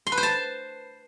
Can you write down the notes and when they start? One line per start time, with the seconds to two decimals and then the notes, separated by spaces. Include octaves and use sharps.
0.07 C6
0.12 B4
0.18 C5
0.23 A5